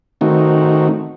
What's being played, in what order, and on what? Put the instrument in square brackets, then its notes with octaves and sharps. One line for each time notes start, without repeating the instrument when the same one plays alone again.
[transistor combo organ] D#3 A3 C4 D#4 F#4